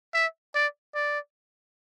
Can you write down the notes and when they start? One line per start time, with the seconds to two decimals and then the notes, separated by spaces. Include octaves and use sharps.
0.14 E5
0.55 D5
0.95 D5